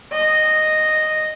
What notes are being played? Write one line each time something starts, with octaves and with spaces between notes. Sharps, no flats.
D#5